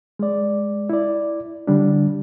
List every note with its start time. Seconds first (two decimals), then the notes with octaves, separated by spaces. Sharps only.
0.19 G#3 D5
0.89 E4 D5
1.67 D3 G3 D4